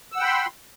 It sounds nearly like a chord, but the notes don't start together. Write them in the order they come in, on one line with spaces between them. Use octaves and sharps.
E6 F#5 G5 B5 C6